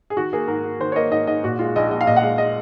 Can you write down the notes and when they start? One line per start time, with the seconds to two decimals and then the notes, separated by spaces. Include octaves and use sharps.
0.10 G#4
0.17 D#3 F#4
0.33 A#3 G#4
0.48 G#2 A#4
0.64 G#2
0.79 D#3 C5
0.92 C#5
0.96 A#3 D#5
1.11 G#2 D#5
1.27 G#2 D#5
1.44 A#2 F#4
1.59 G#3 F4
1.76 A#1 D#5
1.91 A#1 D#5
2.01 F5
2.07 A#2 D#5
2.16 F#5
2.23 G#3 F5
2.38 D#5